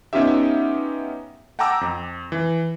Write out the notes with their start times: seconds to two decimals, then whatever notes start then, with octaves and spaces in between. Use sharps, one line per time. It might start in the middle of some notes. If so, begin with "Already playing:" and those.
0.13 B3 C#4 D#4 F4 G4 E5
1.59 F#5 G5 A5 A#5 D6 E6
1.81 F2
2.32 E3